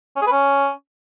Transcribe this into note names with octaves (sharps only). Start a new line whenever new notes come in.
C#4
G#4
B4
C#4